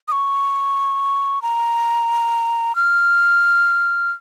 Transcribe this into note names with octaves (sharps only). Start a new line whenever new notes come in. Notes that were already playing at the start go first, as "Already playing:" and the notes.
D#6
C#6
A#5
F6